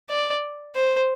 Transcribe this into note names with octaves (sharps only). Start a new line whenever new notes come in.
D5
C5